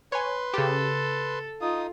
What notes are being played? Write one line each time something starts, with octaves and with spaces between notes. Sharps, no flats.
B4 C#5 G#5 C6
C#3 G4 A4
D#4 F4 D#6